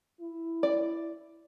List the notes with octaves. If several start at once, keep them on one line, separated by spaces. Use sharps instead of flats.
E4
D5